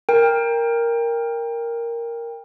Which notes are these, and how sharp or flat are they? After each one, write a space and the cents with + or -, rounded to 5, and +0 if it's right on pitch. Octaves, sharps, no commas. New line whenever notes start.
A#4 +0 G5 +25